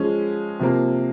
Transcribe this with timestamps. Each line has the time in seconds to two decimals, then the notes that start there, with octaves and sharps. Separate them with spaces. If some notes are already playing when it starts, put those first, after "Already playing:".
Already playing: F3 G#3 C#4
0.60 C3 F3 A#3